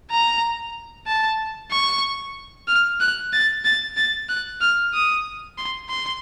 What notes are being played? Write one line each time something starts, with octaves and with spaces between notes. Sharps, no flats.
A#5
A5
C#6
F6
F#6
A6
A6
A6
F#6
F6
D#6
C6
C6